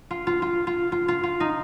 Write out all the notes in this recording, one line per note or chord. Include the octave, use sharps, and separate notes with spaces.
F4
F4
F4
F4
F4
F4
F4
D#4